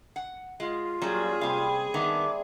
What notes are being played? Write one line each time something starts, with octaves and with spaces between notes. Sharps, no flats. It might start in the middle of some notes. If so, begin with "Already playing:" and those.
F#5
G#3 F4
A#2 F#3 G3 C#4 G#4 G#5
C3 G3 C4 F5
D#3 B3 D4 E5 D6